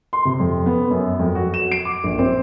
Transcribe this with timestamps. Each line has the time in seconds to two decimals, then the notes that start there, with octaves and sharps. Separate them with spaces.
0.13 C6
0.25 C3
0.40 F2
0.66 B3
0.91 F#2
1.19 F2
1.35 F#4
1.54 E7
1.72 D7
1.85 D6
2.04 A#1
2.19 C4